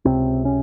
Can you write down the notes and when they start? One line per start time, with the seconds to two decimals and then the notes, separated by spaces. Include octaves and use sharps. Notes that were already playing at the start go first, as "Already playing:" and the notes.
0.05 C#2 C3 C4
0.45 C#4